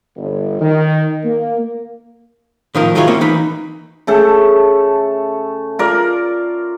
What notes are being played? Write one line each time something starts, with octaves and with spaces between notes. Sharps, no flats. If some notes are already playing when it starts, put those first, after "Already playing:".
G1
D#3
A#3
A2 D#3 F3 A#4
D#3 F#3 G#3 E4 F4 C#5
A#3 C4 C#4
E3 D#4 B5
C#3 A3 A4
F4 A#4 D5